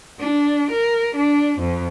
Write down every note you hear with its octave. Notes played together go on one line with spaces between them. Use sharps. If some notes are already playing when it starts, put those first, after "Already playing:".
D4
A#4
D4
F2